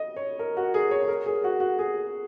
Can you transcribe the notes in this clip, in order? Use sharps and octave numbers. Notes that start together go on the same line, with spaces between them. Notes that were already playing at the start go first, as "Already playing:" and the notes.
Already playing: D#5
C#5
A#4
F#4
G#4
C#5
C#5
A#4
G#4
F#4
F#4
G#4